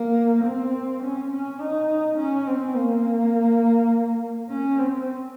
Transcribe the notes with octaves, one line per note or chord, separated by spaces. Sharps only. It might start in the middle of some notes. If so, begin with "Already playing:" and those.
Already playing: A#3
C4
C#4
C#4
D#4
C#4
C4
A#3
C#4
C4